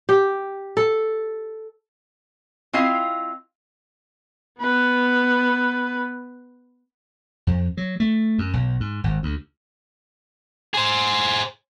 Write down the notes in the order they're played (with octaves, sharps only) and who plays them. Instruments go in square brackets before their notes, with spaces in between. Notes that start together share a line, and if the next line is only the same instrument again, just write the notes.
[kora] G4
A4
[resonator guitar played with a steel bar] C4 E4 F4 D#5 F5
[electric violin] B3 B4
[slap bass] F2
F#3
A3
F#2
B1
G#2
G#1
D2
[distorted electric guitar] G#4 C5